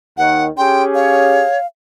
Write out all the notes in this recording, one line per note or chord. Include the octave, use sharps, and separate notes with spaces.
D#2 D#3 F#5
C#4 G4 G#4 G5 C6
C#5 F5